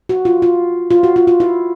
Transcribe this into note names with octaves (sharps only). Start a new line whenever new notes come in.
F#4
F4
F4
F4
F#4
F4
F4
E4